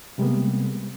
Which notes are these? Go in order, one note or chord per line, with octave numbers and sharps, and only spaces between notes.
C3 G3 G#3 A#3 B3